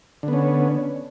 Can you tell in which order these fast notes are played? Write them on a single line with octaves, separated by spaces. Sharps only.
D3 B3 C#4